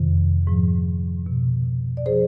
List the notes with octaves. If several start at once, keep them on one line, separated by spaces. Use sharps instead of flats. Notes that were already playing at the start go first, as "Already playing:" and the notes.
Already playing: F2 C3 D#3
G#2 F3
B2
D5
F3 G#4 C5